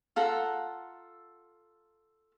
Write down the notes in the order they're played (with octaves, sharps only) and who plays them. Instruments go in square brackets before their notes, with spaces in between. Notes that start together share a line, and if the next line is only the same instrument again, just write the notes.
[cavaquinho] F4 A4 F#5 A#5